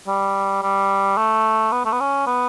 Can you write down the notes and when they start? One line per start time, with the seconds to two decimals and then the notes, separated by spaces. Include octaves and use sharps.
0.08 G3
0.63 G3
1.18 A3
1.72 B3
1.85 A3
1.93 B3
2.00 C#4
2.27 B3